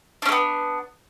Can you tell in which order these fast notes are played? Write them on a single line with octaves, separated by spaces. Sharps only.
D4 C#4 A3 B3